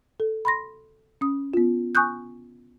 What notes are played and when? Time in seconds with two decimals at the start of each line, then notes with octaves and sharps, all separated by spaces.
0.20 A4
0.45 B5 C6 A#6
1.21 C#4 D#6
1.54 B3 F4
1.95 G#5 C#6 D#6 F#6 G6